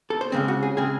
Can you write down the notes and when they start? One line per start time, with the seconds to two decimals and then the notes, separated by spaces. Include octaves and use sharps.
0.10 A4
0.21 C5
0.32 C#2 C#3 G#3 C4
0.48 F#4
0.63 G#4
0.77 C#3 G#3 C4 G#4